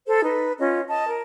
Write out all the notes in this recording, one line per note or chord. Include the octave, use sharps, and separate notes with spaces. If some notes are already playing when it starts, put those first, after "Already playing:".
A4 C5
D#4 B4
C#4 F4 D#5
D#5 A5
A#4